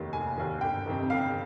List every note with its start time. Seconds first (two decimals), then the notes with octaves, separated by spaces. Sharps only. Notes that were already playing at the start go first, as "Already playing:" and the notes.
Already playing: F1 D#2 D#3
0.13 F1 G#5
0.38 D#2 D#3
0.61 G1 G5
0.86 F2 C3 D#3
1.10 G1 F5